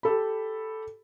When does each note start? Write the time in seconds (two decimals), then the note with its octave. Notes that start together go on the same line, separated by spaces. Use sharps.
0.03 G4 A4 B5